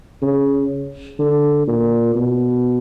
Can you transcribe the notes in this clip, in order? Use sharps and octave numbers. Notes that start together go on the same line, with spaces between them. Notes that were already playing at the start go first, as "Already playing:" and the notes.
C#3
D3
A#2
B2